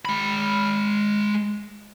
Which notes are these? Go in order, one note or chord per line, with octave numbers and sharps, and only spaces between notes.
G#3 B5